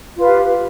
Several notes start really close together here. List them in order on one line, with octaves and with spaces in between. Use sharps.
F4 B4 F5 G4